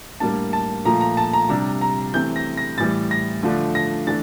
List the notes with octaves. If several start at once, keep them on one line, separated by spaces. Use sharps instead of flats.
A2 G3 A#3 D4 A5
A5
A#2 F3 A3 A#5
A#5
A5
A#5
C3 G3 D4 A#5
A#5
C3 E3 A3 C4 G6
A#6
A#6
A2 E3 G3 A6
A#6
D3 F3 A3 D4
A#6
E3 A3 D4 A6